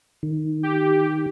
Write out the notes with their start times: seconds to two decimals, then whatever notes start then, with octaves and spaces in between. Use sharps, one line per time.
0.23 D#3
0.63 G4